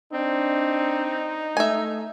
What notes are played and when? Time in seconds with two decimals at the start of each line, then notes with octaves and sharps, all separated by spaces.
0.13 C4 D4 D#4
1.57 A3 E5 G#5